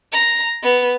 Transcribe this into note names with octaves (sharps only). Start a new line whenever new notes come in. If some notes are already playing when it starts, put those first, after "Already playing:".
A#5
B3